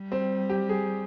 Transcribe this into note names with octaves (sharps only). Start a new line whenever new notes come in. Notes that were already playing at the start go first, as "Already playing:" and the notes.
Already playing: G3
C4
G4
G#4